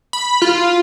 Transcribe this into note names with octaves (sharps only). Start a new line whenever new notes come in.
B5
F4